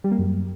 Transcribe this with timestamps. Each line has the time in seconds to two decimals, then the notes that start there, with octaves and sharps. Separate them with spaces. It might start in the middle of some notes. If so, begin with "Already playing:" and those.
0.04 G3
0.11 A#3
0.19 F#2